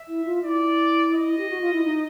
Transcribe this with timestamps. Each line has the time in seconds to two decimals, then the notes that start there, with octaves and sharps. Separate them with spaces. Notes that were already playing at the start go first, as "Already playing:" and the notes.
Already playing: E5
0.08 E4
0.25 F4
0.43 E4 D5
1.14 D#5
1.38 G4
1.49 F#4
1.61 F4
1.73 E4
1.84 D#4